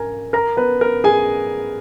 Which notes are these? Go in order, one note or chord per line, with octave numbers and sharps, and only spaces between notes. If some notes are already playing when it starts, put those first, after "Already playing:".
Already playing: A#4 G#5 A#5
A#4 A#5
B3 B4
A#4
G#4 G#5